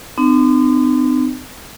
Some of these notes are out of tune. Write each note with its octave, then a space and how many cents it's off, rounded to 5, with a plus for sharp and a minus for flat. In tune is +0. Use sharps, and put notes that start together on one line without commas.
C4 -40 D#4 -45